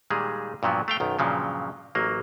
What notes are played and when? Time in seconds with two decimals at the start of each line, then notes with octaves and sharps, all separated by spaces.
0.10 A#2 D#3 G3 G#3 G#4
0.63 G2 A#2 F3 F#3 B3
0.88 A3 F5 G5
1.00 B1 F#2 D#3
1.19 G2 A#2 C#3 F3 F#3
1.95 A1 F#3 A#3